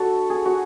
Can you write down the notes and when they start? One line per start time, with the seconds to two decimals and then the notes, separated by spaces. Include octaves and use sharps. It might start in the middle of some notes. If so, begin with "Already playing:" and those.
Already playing: D4 F#4 A4
0.30 G#4
0.46 F#4